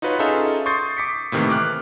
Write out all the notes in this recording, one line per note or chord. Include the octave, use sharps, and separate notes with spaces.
D#4 F4 F#4 B4 C#5
C#4 D#4 F4 G#4 A4 E5
C6 C#6 D#6 G6 A6 C7
D6 B6 C#7
A2 C3 D#3 E3 A#3
D6 F6 F#6